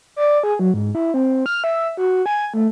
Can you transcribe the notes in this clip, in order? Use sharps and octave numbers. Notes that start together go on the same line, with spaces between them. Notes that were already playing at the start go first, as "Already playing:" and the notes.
D5
G#4
F#3
G#2
E4
C4
F6
E5
F#4
G#5
A3